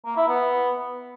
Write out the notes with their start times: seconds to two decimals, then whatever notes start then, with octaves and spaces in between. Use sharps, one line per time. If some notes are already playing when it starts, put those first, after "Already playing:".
0.05 A#3
0.17 E4
0.28 B3